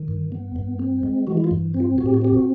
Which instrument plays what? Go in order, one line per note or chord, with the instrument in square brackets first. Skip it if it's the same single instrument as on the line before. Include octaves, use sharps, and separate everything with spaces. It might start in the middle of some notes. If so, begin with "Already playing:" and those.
Already playing: [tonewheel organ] D#3
G2
B3
G2
C4
G#3
E3 F#4
E4
F4
G2
C4
F4
A2 F#4
G4
F#4
C4 G4
F#4